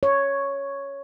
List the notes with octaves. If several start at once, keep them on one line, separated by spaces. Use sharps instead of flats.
C#5